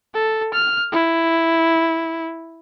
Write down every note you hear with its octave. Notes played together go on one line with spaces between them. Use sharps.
A4
F6
E4